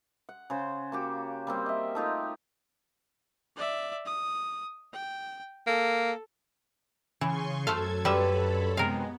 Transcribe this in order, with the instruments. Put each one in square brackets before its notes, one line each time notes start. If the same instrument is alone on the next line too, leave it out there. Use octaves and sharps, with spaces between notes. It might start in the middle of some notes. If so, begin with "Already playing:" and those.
[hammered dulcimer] F#5
C#3 C5
A#3 F#4 G4
G3 A#3 C4
D#5 E5
A3 D#4 F4 G4
[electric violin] D5 E5
D#6
G5
[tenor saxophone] A#3 [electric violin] A4
[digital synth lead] C#3 [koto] E3 [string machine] G#5 C6 C#6
[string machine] F#2 F#3 G#6 [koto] A3 C5 F5 [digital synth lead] A4
[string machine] F#2 C#5 B5 [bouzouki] D3 B3 B4 [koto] G3 E5
[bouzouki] C3 D#4 [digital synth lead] G#3 [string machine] B3 [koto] A#4 F5